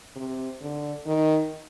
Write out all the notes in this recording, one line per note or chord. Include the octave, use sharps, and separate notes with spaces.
C3
D3
D#3